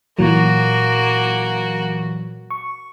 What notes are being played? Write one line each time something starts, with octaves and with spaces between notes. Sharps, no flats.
A#2 E3 F#3 A#3 F#4
C#6